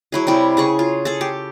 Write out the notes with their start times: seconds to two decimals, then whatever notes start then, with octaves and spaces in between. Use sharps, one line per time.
0.12 F#3 E4 G#4
0.27 C3 G3 E4
0.57 C#3 G#4 C#6
0.79 F4
1.05 G#4 A4
1.21 G4